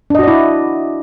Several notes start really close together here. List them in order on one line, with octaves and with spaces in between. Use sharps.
D4 D#5 F#4 D5 E4